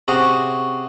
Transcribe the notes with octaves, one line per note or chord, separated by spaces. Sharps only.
C3 C#4 F#4 G#4